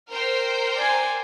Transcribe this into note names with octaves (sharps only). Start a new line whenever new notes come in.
A#4 C5 G5 F6
D5 G#5